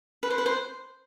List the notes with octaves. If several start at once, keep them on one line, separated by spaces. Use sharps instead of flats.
B4
C5
B4
C5